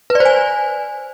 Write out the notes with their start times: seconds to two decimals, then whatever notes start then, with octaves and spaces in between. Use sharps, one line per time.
0.10 B4
0.15 D5
0.20 C5
0.25 G#5